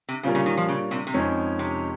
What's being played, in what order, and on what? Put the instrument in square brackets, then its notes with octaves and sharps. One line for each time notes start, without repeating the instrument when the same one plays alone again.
[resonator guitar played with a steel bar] C3
[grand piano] A#2 G3 C#4 F4 A#4 [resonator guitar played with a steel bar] C#3
[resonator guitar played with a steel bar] C#3
D#3
F3
C#3
C3
C3
[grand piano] F2 D#3 G#3 C#4
[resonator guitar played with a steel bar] C3